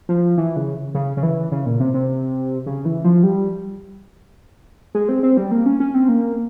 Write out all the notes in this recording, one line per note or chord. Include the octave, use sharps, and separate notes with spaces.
F3
E3
C#3
C#3
C#3
E3
C#3
A#2
C3
C3
C#3
E3
F3
G3
G#3
C4
C4
G3
A#3
C#4
C#4
C4
A#3